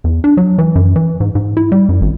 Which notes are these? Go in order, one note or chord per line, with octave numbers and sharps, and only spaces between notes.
E2
D4
F#3
E3
F#2
E3
G#2
G#2
E4
G3
F#2
G#1